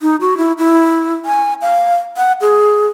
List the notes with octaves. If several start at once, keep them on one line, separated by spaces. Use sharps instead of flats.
D#4
F#4
E4
E4
G#5
F5
F#5
G#4